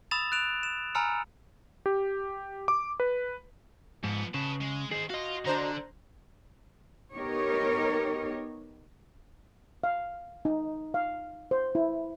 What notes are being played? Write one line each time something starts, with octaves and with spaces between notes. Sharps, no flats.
B5 D#6 E6 A6 E7 F7
F#6 A6 D7 E7 F7
E7
G#5 A#5 B5 E6 F6 C#7
G4
D6
B4
G#2 F3 B3
C#3 B4 A5
G#3
D#3 G#4 C5
F#4 D#5 F5 C6
D3 D4 C5 A#5
B3 D#4 G4 A#4 C#5
F5
D#4
F5
C5
E4